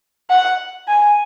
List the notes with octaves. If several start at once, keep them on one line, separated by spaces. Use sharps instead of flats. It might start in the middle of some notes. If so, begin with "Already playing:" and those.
F#5
G#5